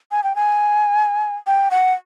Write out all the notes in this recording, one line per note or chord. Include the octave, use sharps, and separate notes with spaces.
G#5
G5
G#5
G5
F#5